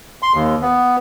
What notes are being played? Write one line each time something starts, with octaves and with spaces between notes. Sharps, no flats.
C6
D#2
B3